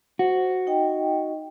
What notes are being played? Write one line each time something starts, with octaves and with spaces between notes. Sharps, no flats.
F#4 C5
D#4 D#5 G5